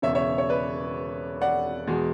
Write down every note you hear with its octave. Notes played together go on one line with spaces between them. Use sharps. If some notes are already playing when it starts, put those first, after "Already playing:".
E1 E2 C#3 C#5 E5
C#5 E5
C#5
B4 D5
D5 F#5
E2 B2 G#3